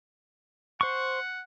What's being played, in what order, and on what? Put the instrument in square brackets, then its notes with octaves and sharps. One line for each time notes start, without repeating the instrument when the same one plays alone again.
[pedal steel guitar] C5 C#6 [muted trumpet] F#5